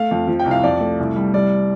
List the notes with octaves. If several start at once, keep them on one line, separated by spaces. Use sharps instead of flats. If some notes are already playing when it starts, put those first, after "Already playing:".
Already playing: A3 F5
F2
F3
G5
C2
F5
F2 D5
A3
C2
G3
G3 D5